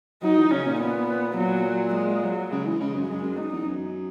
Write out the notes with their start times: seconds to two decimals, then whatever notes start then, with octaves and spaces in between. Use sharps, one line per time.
0.22 F#3 D#4
0.37 E3
0.51 C#3 C#4
0.66 A#2
0.80 B3
1.31 B2
1.37 A#2 F#3
1.94 G#3
2.23 F#3
2.52 C#3 G#3
2.66 E3
2.80 C#3
2.95 F#2
3.09 F#2 G#3
3.23 F#2
3.37 D#4
3.52 E2
3.66 F#2